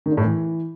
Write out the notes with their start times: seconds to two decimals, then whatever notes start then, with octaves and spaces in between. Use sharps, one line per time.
0.06 D#3
0.12 D3
0.17 A2
0.23 E3